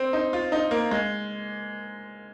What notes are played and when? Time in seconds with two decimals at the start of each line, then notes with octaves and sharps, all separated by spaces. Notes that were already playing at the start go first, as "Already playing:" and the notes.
Already playing: C4
0.13 D#4
0.33 F4
0.52 D#4
0.71 A#3
0.91 G#3